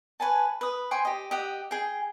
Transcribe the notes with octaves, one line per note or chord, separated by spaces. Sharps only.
B4 C#5 G#5 A5
B4 D#6
C5 G5 G#5 C#6
G4 D#5
G4 D#5 F#5
G#4 G5